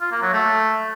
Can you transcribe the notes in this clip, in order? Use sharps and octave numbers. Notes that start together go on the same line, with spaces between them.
F4
A#3
F#3
A3